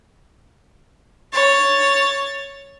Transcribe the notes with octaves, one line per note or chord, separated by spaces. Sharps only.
C#5 A6